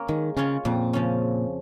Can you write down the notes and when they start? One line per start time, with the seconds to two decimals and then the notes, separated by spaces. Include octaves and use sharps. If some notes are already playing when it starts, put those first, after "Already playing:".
Already playing: A#3 C#4 A#4
0.08 D#3 G#3
0.37 C#3 C#4 F4 C#5
0.65 F2 A#2
0.93 C#3 F3 C#4